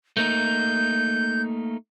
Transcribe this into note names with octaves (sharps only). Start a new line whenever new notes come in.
A3 A#3 D#4 G6